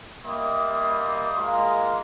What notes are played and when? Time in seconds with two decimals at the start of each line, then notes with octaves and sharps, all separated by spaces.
0.25 G3 A#3 D#5 E5 C6 D#6
1.38 G#3 A#3 F4